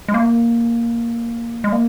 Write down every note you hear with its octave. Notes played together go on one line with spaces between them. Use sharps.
G#3
A#3
G#3
A#3